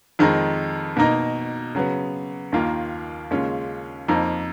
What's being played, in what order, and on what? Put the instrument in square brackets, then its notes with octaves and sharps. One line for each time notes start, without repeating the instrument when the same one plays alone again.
[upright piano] F2 D#3 G#3 D#4
B2 A#3 D#4
C#3 F#3 B3
D#2 D#3 A#3 F4
D#2 C#3 G#3 C#4 F4
F2 F3 A#3 D#4